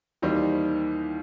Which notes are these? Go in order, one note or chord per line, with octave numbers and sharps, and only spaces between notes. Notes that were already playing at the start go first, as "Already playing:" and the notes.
D#2 D#3 E3 G3 C4 D#4